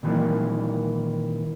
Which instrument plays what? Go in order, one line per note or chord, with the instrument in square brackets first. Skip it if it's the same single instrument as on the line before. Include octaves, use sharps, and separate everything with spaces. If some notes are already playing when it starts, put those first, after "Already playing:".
[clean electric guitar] A#2 D#3 E3 F#3 A#3